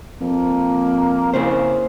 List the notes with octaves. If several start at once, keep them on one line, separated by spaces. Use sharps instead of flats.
F2 A#3
C#3 A#3 E4 C5